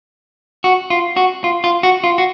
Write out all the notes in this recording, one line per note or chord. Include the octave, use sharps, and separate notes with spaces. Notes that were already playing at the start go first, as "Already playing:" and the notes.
F#4
F4
F#4
F4
F4
F#4
F4
F#4